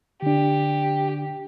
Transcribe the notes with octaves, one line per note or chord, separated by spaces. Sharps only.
D3 D4 G4